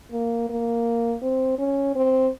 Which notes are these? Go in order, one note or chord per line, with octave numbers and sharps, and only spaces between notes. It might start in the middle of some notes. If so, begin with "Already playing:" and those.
A#3
A#3
C4
C#4
C4